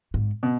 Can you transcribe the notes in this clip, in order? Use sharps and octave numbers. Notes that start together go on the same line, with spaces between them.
G#2
B2